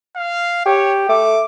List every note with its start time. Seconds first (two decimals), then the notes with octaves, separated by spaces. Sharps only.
0.16 F5
0.66 G4 C#5
1.09 A3 D6